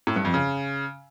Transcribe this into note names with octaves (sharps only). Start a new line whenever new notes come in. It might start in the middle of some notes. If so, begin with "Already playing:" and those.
A2
G2
F2
C#3